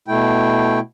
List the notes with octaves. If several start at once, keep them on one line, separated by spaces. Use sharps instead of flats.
B2 A3 E4 G5